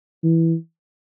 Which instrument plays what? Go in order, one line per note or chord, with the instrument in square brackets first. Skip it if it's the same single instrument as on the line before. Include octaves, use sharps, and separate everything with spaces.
[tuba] E3